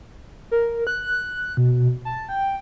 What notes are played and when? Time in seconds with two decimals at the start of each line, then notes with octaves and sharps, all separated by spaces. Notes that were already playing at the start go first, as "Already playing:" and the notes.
0.51 A#4
0.87 F#6
1.57 B2
2.05 A5
2.29 G5